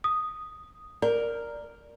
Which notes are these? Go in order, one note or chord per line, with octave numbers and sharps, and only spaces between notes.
D#6
A#4 D5